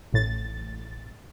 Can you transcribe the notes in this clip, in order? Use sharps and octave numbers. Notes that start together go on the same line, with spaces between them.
A1 A2 A6